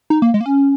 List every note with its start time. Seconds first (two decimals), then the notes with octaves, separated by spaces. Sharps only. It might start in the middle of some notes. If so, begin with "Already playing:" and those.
0.10 D#4
0.22 A#3
0.34 G#3
0.41 A#3
0.46 C#4